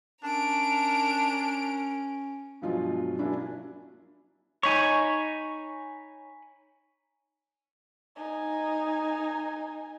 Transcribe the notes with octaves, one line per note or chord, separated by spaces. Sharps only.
C#4 D4 A#4 D7
G2 B2 F3 F#3 G#3 F4
F#3 A#3 C#4 D4 E4
D#4 C#5 G#5 B5 C#6
D#4 G#5